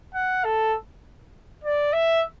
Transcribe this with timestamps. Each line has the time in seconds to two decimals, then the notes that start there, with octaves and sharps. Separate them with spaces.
0.14 F#5
0.44 A4
1.64 D5
1.93 E5